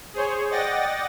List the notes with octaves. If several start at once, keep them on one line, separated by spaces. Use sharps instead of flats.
G#4 C5 C#5
D5 D#5 F#5 G5 A6 A#6